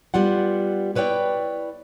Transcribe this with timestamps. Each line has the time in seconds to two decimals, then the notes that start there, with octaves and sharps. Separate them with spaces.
0.14 G3 B3 F4 F#5
0.95 E4 B4 C#5 D5 G5